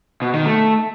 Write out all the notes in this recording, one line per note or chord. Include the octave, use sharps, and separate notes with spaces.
B2
D#3
A3